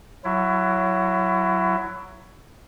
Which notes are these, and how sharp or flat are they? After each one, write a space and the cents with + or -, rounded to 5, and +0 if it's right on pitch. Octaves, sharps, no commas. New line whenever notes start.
F#3 +5 E4 +25